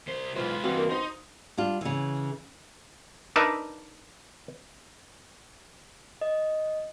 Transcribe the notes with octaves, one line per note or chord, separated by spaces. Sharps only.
C2 C5
B1 E3 G#3 F4 B4 C5
G2 B2 E3 G3 C4 F#4 F5
A#3
D#4 C5
G3 D4 F4
C#3 E3
D4 D#4 A#4 B4 E5
D#5